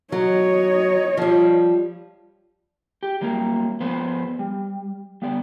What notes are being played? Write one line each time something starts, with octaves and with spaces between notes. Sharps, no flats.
F#3 C#5 D#5
F3 G3
G4
F#3 G3 A#3
F3 B3 B4 C5
G3
G3 B3 D5